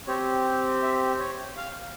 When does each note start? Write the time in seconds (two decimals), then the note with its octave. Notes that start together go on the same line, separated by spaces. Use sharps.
0.07 C4 G4 C#5
0.82 E5
1.19 C#5
1.57 F5